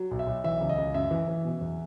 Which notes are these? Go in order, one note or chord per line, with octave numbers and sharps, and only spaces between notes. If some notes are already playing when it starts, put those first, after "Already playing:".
Already playing: F#3
B1
E5
B1
E3 E5
C#2
D#5
C#2
F#2 E5
E3
E3
B2
E2